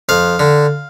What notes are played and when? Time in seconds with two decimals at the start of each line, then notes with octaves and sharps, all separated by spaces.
0.09 F2 F5
0.40 D3